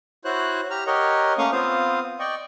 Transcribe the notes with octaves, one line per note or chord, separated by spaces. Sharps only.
E4 F#4 C5 C#5 F#6
G4 A#5 F6
G4 A#4 C#5 D#5 F#5
A3 A#3 C#4 F5 C#6 D#6
B3 C4 F4 C5 F5 D#6
D5 D#5 G5 C#6